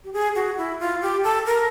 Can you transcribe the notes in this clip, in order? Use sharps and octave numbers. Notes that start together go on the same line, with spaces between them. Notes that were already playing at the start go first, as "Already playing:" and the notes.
G4
G#4
F#4
E4
F4
G4
A4
A#4